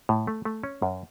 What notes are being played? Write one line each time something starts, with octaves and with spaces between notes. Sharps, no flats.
A2
A3
A3
C#4
F#2